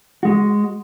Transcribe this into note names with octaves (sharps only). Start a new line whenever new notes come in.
G#3 F#4